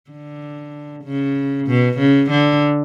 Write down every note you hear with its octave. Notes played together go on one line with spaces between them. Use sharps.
D3
C#3
B2
C#3
D3